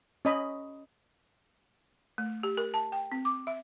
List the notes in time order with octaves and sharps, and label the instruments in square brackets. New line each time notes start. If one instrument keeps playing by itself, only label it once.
[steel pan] C#4 D#5 B5
[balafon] A3
G4
A#4
A5
G5
C4
D6
E5